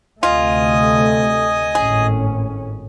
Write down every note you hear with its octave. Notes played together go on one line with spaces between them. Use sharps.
D2 C3 A3 F4 D#5 G#5 D#6
G#1 A2 C#4 G#4